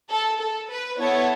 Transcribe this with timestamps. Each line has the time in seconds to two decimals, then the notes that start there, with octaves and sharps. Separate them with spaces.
0.10 A4
0.40 A4
0.70 B4
0.99 B3 E4 A4 C#5